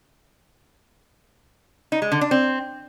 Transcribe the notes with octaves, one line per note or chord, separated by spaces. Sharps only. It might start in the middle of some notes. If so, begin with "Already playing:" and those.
D#4
G#3
D3
D4
C4